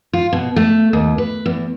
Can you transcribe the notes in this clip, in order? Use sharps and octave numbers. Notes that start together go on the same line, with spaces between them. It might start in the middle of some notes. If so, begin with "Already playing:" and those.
F4
B2
A3
D#2
B4
E2